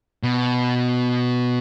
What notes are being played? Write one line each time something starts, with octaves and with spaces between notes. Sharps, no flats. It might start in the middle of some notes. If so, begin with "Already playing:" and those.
B2